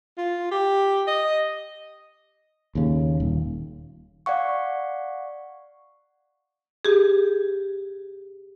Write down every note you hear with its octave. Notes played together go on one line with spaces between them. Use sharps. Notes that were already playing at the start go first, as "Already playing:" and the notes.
F4
G4
D#5
D#2 C#3
D#1
D5 F5 F#5 C#6
G4 G#4